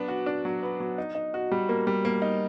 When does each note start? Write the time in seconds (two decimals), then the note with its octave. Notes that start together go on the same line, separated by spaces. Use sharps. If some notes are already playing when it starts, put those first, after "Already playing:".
Already playing: F#3 B3 D4
0.08 F#4
0.26 D4
0.45 F#3
0.63 B3
0.80 F#3
0.98 D#4
1.15 D#4
1.34 F#4
1.52 G3
1.69 A#3
1.87 G3
2.05 A#3
2.22 D#4